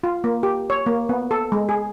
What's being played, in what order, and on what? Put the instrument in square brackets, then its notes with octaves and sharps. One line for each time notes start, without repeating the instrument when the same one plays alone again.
[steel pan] F4
A#3
G4
C#5
A#3
B3
A4
G#3
G#4